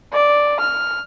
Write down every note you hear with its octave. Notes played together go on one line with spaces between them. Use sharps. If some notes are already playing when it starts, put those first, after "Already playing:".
D5
F6